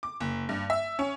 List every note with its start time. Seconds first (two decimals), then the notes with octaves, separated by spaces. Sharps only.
0.03 D6
0.21 F#1
0.49 G2
0.70 E5
0.99 C#4